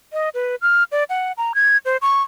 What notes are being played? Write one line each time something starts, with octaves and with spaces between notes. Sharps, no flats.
D#5
B4
F6
D5
F#5
A#5
G#6
C5
C#6